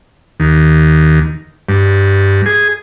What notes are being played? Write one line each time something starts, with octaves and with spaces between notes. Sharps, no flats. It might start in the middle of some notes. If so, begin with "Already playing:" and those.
D#2
G2
G#4